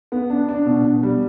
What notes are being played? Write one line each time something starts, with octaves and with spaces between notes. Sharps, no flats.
B3
D4
D4
B2
B2
G3